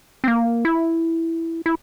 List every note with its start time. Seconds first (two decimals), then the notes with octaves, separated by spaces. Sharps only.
0.24 C4
0.28 A#3
0.65 E4
1.66 E4